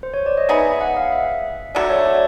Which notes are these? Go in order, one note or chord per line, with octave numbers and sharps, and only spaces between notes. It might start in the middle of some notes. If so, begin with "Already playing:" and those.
C5
C#5
D5
D#5
G#3 B3 D#4 G#4 E5
F#5
F5
E5
D3 F#3 A3 D5
C#5
D5